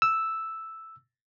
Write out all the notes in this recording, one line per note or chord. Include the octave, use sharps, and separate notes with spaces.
E6